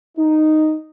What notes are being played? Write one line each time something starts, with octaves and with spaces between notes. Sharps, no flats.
D#4